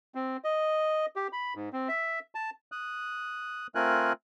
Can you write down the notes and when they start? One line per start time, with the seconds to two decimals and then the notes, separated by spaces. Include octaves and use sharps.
0.15 C4
0.44 D#5
1.16 G4
1.33 B5
1.55 G#2
1.73 C4
1.89 E5
2.35 A5
2.72 D#6 F#6
3.75 A3 C4 F4 A#4 G#5 F#6